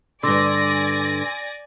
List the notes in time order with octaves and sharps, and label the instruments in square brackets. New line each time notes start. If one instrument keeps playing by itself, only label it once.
[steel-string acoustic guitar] G2 D3 [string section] D5 G#5 A#6 [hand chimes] C6 D6 E6